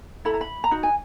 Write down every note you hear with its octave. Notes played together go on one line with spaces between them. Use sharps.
E4 A4 B5
A#5
B5
A#5
D#4 F#4
G#5